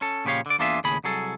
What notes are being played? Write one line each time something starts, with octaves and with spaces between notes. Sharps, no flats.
C#4 A4
A#2 C#3 F3 G4 C#5 F5
D3 D5
E2 A#3 D4 F4 G#4 E5
D#2 A2 C#3 G#4 B5
C2 F#3 G#4 A4